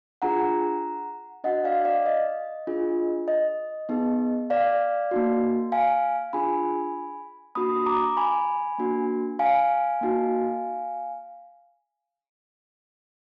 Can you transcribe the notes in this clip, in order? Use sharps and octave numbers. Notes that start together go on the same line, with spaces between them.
D4 F4 G#4 F#5 A#5
D4 F#4 D#5 F#5
D5 F5
D5 F5
D#5
D4 F4 G#4
D#5
B3 D#4 G#4
D5 F5
A#3 D#4 F#4
F5 G#5
D4 F4 G#4 G#5 B5
A#3 D4 F#4 B5 D#6
A#5 D6
G#5 B5
A#3 D4 F#4
F5 G#5
A#3 D#4 F#4